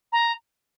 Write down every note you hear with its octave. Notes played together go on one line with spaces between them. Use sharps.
A#5